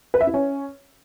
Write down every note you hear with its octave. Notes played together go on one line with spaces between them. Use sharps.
B4
E5
E4
C#4